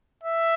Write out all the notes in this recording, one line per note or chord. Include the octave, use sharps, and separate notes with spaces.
E5